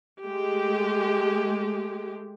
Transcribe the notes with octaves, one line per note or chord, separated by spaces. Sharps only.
G#3 A3 G4